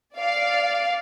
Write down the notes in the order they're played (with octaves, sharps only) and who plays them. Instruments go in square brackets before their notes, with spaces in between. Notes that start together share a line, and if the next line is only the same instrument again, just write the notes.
[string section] D5 F5